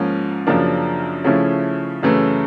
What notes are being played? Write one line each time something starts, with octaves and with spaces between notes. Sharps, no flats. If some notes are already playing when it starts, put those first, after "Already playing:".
Already playing: G#2 F3 A#3 C#4
F#2 C#3 F3 A#3 D4
C#3 F3 A3 C#4 E4
F#2 C#3 E3 A3